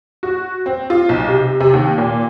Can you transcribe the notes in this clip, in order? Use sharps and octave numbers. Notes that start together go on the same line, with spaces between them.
F#4
C4
F4
B1
C3
C3
D#2
A#2